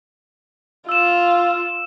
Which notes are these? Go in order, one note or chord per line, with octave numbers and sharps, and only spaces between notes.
F4 E6 E7